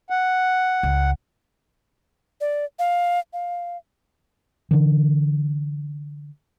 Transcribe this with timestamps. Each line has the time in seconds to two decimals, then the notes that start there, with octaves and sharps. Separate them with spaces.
0.10 F#5
0.83 C#2
2.41 D5
2.79 F5
3.33 F5
4.71 D3 E3